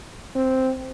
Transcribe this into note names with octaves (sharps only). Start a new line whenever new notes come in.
C4